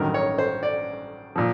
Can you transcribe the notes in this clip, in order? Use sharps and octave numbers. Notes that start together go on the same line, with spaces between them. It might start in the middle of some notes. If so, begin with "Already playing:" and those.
Already playing: A1 G2 D#3 F#3 A#4
C#5
C5
D5
A#2 F3